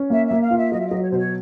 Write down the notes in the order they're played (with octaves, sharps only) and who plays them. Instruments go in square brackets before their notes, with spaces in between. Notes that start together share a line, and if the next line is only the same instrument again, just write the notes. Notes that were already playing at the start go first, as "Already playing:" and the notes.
Already playing: [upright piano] C#4
[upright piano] A#3 [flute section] E5
[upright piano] A#3 [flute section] E5
[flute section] F5
[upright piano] F4
[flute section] E5
[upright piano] F#3 [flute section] D#5
[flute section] E5
[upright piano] F#3 [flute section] D#5
[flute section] C#5
C5
[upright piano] B2
[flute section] C#5